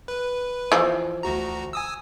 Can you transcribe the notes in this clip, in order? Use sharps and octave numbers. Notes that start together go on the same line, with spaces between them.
B4
E3 F3
D2 F#4 A#5
G#5 D#6 E6